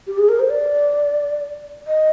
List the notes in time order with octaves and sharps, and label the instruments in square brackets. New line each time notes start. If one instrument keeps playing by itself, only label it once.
[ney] G4
G#4
A#4
C5
D5
D#5